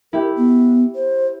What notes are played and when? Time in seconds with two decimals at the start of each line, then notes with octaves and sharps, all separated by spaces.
0.13 E4 G4 A#4
0.36 B3
0.95 C5